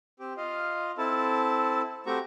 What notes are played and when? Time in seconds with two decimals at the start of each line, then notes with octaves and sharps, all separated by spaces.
0.20 C4 G4
0.37 F4 D#5 F5
0.98 C4 E4 A4 A5
2.06 A3 C4 F#4 G4 A#5 C#6